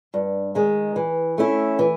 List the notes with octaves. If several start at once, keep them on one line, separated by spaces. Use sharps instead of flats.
G2
D#3 G#3
E3
A3 C#4 E4
E3